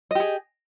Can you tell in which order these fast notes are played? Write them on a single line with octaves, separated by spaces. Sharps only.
D#5 G4 G#4